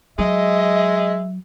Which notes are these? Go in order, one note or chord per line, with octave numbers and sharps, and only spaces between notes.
F#3 G#3 D#5 E5